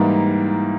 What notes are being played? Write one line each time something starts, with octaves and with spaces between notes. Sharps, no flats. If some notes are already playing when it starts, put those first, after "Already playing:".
Already playing: G#2 E3 G3 A#3 D#4